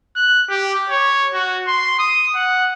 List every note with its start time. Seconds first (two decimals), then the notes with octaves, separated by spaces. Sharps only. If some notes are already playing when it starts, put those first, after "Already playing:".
0.16 F#6
0.50 G4
0.89 C#5
1.34 F#4
1.67 C6
1.99 D#6
2.36 F#5